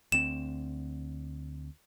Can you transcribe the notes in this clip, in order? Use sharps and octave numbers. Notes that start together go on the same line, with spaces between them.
D2 C4 E7